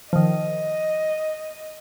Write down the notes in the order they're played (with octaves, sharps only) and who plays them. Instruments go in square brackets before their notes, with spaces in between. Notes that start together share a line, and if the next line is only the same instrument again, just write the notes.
[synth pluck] D#3 F3 [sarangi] D#5